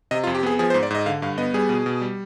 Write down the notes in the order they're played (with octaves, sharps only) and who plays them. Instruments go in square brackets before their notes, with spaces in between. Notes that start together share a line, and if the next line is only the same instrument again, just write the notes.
[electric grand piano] C3 D#5
F4
F2
G4
B3 G#4
F3 G#4
C5
G#2
D5
G#2 D#5
D3 F5
G2 F5
B3 D#5
G3 G#4
B2
B2
G3